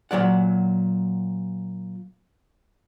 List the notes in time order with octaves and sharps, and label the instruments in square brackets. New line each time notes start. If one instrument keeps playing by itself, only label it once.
[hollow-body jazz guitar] A#2 F#3 D5 F#5